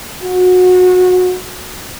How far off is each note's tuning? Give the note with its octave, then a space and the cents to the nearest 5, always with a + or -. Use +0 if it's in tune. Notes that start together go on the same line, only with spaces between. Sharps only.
F#4 -25